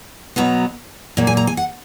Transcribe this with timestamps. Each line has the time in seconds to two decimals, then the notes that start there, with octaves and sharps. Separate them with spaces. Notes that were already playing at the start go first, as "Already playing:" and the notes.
0.36 B2 F#3 B3 A#5
1.17 A#2 F#3 A#3
1.27 G#5
1.37 A#5
1.47 G#5
1.57 F#5